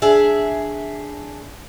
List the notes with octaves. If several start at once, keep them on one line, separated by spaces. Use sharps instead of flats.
D4 G#4 E5